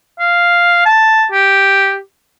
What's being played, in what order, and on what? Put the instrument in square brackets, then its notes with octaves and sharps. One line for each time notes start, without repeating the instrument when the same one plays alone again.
[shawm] F5
A5
G4